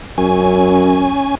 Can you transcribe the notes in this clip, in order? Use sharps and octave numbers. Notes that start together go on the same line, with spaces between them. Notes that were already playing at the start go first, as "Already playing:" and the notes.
F#2 C#4 G#5